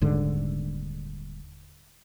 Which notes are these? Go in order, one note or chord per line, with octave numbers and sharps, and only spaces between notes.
D#1 G#2 D3